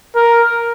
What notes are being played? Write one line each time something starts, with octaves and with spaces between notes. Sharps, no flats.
A#4